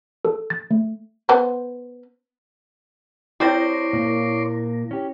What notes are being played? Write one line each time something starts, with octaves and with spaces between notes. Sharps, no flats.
A4
A6
A3
B3 C5
G3 C4 E4 C5 C#5 C6 D6 A#6
A#2 A#3
C#4 G4